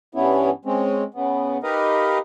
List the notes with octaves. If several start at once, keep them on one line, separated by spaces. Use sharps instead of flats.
G2 E3 B3 C#4 E4
G#3 C4 C#4
C#3 B3
D#4 G4 A#4 B4 D#5 F5